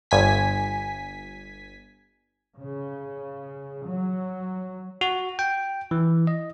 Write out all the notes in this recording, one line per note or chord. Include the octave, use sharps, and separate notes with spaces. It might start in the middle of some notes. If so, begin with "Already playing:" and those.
G1 G#5 B6
C#3
F#3
F#4
G5
E3
D#5